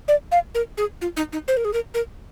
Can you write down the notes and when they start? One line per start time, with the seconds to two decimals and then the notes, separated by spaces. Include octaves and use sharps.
0.08 D5
0.32 F5
0.55 A#4
0.77 G#4
1.01 F4
1.17 D#4
1.33 D#4
1.48 C5
1.57 A#4
1.65 G#4
1.73 A#4
1.94 A#4